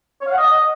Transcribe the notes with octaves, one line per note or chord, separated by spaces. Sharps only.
C#5
F5
F#5
D#5